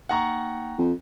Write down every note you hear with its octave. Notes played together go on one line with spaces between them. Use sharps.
A#3 D#4 F#5 G5 A#5 C#6
F2